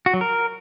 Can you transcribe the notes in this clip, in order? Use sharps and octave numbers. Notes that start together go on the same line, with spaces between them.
F#4
F#3
A#4